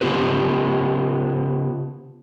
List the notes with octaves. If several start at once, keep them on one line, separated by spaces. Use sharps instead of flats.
C#3 E3 B3 F4 G4 B4